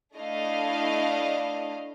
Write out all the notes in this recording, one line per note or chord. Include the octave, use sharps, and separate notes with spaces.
A3 D4 E4 D#5 F5